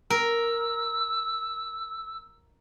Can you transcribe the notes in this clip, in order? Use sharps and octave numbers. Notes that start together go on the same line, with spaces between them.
A#4 E6